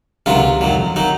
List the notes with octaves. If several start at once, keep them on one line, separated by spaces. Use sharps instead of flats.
C#2 C3 D#3 F#3 F4
F2 D#3 F#3
D#3 F#3 D#4